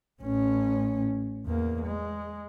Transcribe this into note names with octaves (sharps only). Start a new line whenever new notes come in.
A1 C#4
E2 A#3
G#3